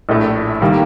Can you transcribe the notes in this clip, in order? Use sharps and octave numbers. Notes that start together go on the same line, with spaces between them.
A#1 A2 A3
D#3 G3 A#3